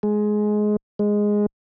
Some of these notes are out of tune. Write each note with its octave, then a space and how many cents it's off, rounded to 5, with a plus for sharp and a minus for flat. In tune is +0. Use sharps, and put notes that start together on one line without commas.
G#3 +15
G#3 -5